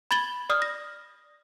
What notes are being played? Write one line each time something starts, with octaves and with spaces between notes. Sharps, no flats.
B5 G#6 A6 F#7 G7
D5 D#6 F6
A#6